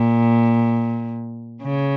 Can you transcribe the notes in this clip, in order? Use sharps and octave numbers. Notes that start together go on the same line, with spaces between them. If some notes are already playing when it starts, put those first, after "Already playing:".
Already playing: A#2
C#3